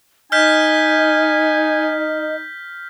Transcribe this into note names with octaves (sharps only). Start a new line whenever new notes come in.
D#4 D#5 G#5 F6 G6 B6